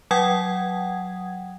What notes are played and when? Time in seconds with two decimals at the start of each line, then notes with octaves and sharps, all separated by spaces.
0.11 F#3 F#5 G5 D#6 G#6